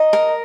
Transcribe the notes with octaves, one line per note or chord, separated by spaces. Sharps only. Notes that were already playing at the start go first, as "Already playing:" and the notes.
Already playing: D#5 A#5
A#4